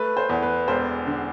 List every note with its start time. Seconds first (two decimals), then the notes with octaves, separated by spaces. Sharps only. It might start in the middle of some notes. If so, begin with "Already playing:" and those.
Already playing: A3 B4
0.17 C5
0.29 E2
0.43 B4
0.68 E1 C5
1.07 D3